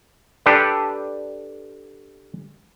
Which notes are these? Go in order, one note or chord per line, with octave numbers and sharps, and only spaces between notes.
D4 G4 A4 B4 D5